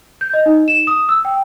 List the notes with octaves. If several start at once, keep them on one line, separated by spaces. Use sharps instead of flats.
G6
D#5
D#4
E7
D#6
E6
G5